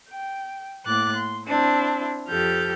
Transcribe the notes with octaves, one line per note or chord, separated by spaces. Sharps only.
G5
A2 A#3 D6 F#6 A6
C6
C4 D4 E4
F2 F3 G4 A4 F6 G6